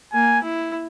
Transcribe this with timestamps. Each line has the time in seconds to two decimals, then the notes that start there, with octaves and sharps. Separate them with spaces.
0.13 A#3 G#5
0.43 E4